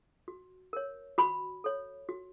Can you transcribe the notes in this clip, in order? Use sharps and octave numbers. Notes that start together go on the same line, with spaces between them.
F#4
A#4 C#5
F#4 B5
A4 C#5
F#4